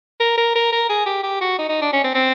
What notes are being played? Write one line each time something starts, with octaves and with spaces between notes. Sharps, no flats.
A#4
A#4
A#4
A#4
G#4
G4
G4
F#4
D#4
D#4
D4
C#4
C4
C4